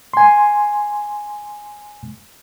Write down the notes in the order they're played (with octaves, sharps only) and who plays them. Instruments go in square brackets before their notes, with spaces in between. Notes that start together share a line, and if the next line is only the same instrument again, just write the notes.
[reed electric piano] G#5 C6